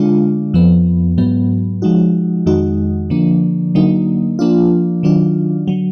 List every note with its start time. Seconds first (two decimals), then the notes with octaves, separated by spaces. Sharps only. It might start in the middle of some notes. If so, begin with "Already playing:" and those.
Already playing: D3 G#3 D4 F4
0.54 F2 F3 B3
1.18 G#2 F#3 B3
1.82 F3 G#3 D#4 F#4
2.46 F2 D#3 G#3 D#4 F#4
3.10 D3 F3 A#3 D4
3.75 D3 F#3 A#3 D#4
4.39 F3 A#3 D4 F4
5.03 D#3 F#3 D4 F4
5.68 D3 F#3